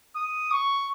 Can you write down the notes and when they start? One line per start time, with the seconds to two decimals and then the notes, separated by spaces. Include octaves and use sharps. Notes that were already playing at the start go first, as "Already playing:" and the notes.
0.16 D#6
0.52 C#6